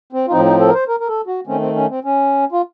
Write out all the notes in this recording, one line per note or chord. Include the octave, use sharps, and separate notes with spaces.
C4
F4
A2 F3 C4 D#4
D#4
A4
A#4
C5
A#4
A#4
A4
F#4
D#3 A3 C4 C#4
C4
C#4
C4
C#4
F4